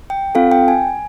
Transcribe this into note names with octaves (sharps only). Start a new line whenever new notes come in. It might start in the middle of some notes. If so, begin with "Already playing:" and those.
G5
C4 F4 A4 F5
G5
G#5